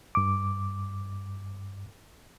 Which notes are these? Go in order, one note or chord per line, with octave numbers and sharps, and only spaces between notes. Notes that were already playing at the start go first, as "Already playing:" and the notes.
G2 D6